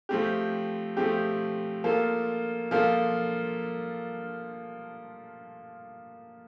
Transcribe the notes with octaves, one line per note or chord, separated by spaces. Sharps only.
F3 A3 C4 G4
F3 A3 C4 G4
F3 A#3 F4 A4
F3 A#3 F4 A4